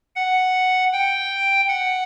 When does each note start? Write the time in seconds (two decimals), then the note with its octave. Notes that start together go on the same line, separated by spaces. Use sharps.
0.16 F#5
0.92 G5
1.68 F#5